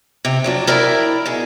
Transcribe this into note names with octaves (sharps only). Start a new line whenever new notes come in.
C3
F2 F#3 D4
E4 A#4 D5 E5 G5
B2 G#4